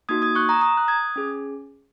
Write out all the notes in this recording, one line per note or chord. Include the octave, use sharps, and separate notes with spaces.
A#3 D#4 F#4 D#6 G#6
D#6 G#6
C#6 F#6
A#5 D#6
A#5 D#6
F#6
D#6 G#6
C#4 G#4